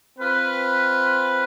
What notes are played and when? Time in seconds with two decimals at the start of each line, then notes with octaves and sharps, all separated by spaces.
0.19 C4 F4 B4